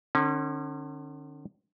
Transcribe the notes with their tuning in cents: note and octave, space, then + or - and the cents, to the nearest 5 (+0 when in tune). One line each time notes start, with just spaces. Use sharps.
D3 +40 C#4 -30